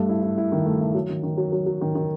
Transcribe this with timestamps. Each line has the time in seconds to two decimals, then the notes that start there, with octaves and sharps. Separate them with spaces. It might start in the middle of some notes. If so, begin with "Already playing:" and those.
Already playing: G2 A3
0.09 E4
0.23 E4
0.38 E4
0.52 D#3
0.66 A3
0.81 E4
0.94 F#3
1.09 D#3
1.23 D#3
1.38 F#3
1.52 F#3
1.66 F#3
1.81 D#3
1.95 D#3